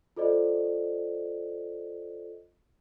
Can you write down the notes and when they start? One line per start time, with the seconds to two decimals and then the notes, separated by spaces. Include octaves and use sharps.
0.16 F4 A4 C5 D5 D#5